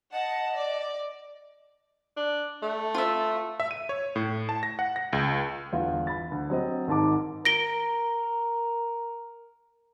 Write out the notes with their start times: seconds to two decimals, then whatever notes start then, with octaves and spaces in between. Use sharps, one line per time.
0.13 D#5 F#5 A5
0.55 D5
2.16 D4
2.62 A3
2.95 F4 E5
3.60 E5
3.71 D#7
3.89 C#5
4.16 A2
4.49 A5
4.63 A#6
4.79 F#5
4.96 A#6
5.13 C#2
5.73 G1 E2 F4
6.07 B5 A6
6.31 D2
6.50 F#3 C4 D#5
6.88 G#1 G#2 A5 D6
7.45 A#4 A#6 D7 G7